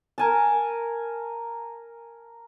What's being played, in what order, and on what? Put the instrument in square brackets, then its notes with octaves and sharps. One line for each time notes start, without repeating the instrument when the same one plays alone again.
[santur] A#4 G#5 A5